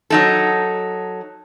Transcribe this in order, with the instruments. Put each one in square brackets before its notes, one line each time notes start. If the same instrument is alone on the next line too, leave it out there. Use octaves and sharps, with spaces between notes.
[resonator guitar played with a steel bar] F#3 D#4 A4